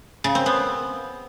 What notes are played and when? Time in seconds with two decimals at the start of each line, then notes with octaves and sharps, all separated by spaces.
0.24 C#3
0.35 C4
0.46 B3